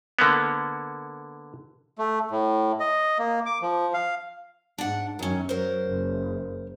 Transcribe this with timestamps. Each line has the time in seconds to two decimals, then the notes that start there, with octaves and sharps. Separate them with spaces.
0.19 D3 A#3 B3
1.98 A3
2.31 A2
2.80 D#5
3.19 A#3
3.46 D6
3.62 F3
3.94 F5
4.78 G#2 D4 F#5
5.19 F#2 D#3 F#3 C#4
5.49 F#3 A#4 C5
5.87 F#1